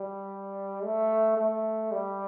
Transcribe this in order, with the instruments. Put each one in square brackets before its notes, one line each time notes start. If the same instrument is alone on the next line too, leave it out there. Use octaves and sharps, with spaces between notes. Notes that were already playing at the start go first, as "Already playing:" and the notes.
Already playing: [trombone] G3
A3
A3
G3